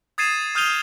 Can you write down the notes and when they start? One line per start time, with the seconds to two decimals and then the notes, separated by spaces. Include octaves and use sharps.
0.18 D#6 G#6 A6 C7 D#7 E7
0.55 D#6 F6 G6 D#7 F7 G7